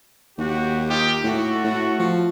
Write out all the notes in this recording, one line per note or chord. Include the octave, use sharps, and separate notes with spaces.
D#2 F#4 G4
D#4 F4 G4
A2 A3 F#4
A2
F3